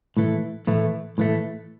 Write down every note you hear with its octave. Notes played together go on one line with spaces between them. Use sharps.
A2 E3 A3
A2 E3 A3
A2 E3 A3